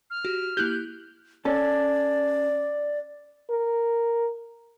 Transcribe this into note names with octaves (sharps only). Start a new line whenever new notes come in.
F6
F#4 G4
A#3 E4 G4 F#6 G6
C#4 A4 D5
A#4